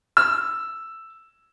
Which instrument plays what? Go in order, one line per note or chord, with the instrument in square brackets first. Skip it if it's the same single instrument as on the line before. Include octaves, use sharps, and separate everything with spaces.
[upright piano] E6